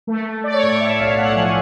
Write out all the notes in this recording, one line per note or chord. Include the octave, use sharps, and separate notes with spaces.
A3
A3
A3 D5
C#5
A2 D5
A2 E5
B1 F5
A3 F#5
F3 G#5